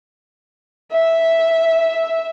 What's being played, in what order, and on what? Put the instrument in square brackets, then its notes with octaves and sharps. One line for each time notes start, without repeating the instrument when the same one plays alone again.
[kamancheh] E5